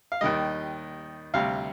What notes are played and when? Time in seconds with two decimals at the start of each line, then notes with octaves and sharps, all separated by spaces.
0.12 F5
0.21 D#2 D#3 G3 D#5
1.34 D2 C3 G3 F5